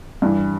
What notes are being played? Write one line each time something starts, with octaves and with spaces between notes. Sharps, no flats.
G2 E3 G3